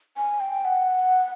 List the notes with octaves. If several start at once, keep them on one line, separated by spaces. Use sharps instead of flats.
G#5
G5
F#5